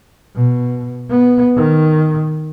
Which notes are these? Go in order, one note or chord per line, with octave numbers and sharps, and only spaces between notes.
B2
B3
D#3